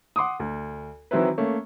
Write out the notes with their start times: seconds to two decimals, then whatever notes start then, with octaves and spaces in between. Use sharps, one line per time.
0.16 F#5 C6 D6 D#6
0.40 D2
1.11 D#3 E3 F#3 C4 E4 B4
1.38 A3 A#3 C#4